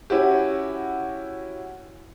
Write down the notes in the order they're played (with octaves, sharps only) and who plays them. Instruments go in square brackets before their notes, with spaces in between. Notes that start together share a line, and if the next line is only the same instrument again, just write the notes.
[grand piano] C#4 E4 F#4 G4